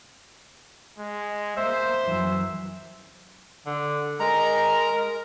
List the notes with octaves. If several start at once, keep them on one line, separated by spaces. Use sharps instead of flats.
G#3
A#3 C5 E5
F#2 E3 F#3
D3
G#3 A#4 A#5